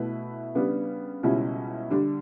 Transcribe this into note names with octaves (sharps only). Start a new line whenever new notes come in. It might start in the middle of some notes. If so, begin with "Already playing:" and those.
Already playing: B2 A3 E4 B4
C#3 G3 B3 D4
C#2 B2 G3 C#4 E4
D3 G3 D4